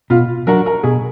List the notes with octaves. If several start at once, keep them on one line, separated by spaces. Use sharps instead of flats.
B2 F4
F#3 D4 F#4 A#4
A#4
B2 G#4